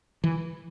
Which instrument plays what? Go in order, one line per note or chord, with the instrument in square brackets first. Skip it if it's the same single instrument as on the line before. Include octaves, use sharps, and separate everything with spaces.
[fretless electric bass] E3